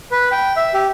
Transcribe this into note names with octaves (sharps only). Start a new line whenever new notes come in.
B4
G5
E5
G4